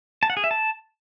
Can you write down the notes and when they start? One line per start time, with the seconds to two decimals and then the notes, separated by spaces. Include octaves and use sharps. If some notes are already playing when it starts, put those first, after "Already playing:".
0.23 A5
0.30 F#5
0.37 G#4
0.44 E5
0.51 A5